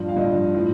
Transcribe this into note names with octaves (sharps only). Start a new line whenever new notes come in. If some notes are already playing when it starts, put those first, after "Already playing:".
Already playing: G2 F3
F5
G2 F3 D#5
A2 F3